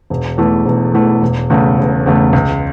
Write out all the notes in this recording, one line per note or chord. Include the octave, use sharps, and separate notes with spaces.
E1
E2 E3 A3
E1
E2 E3 A3
E1
E2 C#3 A3
E1
E2 C#3 A3
C#2